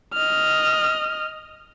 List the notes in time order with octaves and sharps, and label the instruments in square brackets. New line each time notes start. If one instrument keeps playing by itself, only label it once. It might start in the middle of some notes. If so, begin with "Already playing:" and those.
[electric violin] D#5 F6